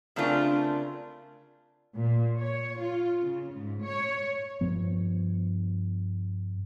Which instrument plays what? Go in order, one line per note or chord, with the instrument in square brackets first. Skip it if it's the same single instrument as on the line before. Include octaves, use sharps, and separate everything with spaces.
[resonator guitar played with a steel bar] C#3 A3 C4 D4 F4 A#4
[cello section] A#2
C#5
F4
C#3
G#2
C#5
[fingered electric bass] G2 F3 B3